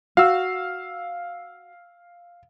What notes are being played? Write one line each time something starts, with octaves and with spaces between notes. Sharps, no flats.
F#4 F5 E6